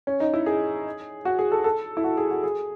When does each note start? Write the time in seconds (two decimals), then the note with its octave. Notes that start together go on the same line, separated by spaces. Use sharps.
0.07 C#4
0.20 D#4
0.34 E4
0.46 G#4
1.25 F#4
1.39 G#4
1.52 A4
1.64 A4
1.97 E4
2.04 F#4
2.17 G#4
2.31 F#4
2.43 G#4